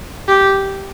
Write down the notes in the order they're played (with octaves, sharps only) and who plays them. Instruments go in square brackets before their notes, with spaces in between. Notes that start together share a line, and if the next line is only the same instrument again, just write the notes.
[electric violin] G4